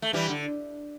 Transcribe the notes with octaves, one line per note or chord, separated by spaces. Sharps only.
A3
E3 G3
D3